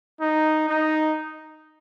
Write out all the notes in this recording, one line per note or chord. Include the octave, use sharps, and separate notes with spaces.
D#4
D#4